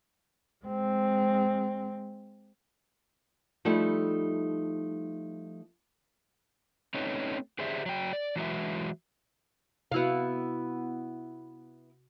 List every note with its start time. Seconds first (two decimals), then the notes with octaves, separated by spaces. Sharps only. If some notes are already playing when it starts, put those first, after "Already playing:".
0.65 G#3 C4
3.65 F3 G3 A3 D#4 E4 A4
6.94 A3 C4 C#4 D#4 B4 C#5
7.59 G4 G#4 C5 D5 E5
7.86 F#3 G5
8.13 D5
8.36 E3 F#3 G#3 F#4 B4 E5
9.92 C3 B3 E4 F#4 F5